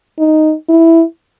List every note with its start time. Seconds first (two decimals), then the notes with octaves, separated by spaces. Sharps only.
0.19 D#4
0.69 E4